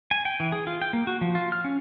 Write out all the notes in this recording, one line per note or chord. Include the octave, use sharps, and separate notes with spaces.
G#5
G5
E3
G#4
F4
G5
A#3
F#4
F3
F4
F6
C#4